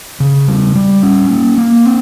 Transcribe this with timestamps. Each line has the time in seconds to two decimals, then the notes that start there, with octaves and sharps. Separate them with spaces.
0.20 C#3
0.48 G3
0.75 G3
1.03 C#4
1.30 A#3
1.58 A#3
1.85 C4